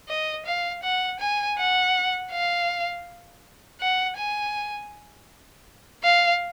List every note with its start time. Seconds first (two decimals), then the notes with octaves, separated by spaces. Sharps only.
0.08 D#5
0.46 F5
0.83 F#5
1.20 G#5
1.58 F#5
2.31 F5
3.81 F#5
4.17 G#5
6.03 F5